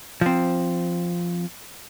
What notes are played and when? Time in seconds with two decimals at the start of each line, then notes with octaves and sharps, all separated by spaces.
0.21 F3 C4